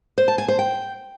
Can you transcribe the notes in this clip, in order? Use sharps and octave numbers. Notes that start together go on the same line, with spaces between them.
C5
A5
G#5
C5
G5